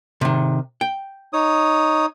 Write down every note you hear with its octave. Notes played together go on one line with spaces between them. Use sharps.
C3 D#3
G5
D#4 C#5 D#6